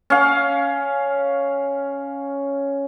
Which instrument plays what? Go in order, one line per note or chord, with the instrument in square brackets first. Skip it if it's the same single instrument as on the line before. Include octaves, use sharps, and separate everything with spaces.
[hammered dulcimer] C#4 F5